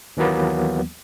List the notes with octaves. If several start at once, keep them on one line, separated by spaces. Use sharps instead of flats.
D#2 E3 F#3 A#3 B3